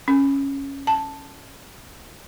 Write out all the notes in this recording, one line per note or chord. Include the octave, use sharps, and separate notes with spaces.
C#4
A5